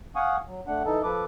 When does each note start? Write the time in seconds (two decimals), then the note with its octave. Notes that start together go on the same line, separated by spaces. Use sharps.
0.16 F5 F#5 G#5 C#6 D#6
0.47 F#3
0.67 A3 D4 F#5
0.85 E3 D#4 A4
1.04 F3 A4 B4 D6